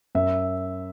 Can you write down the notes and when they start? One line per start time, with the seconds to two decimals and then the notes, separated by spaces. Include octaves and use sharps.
0.15 F#2 E5